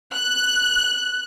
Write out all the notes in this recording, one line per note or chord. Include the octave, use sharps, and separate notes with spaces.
F#6